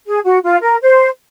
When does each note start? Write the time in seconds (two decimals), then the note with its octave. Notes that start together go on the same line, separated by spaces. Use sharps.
0.06 G#4
0.24 F#4
0.44 F4
0.63 A#4
0.82 C5